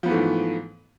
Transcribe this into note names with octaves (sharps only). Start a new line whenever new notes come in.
G#2 E3 F3 A3 B3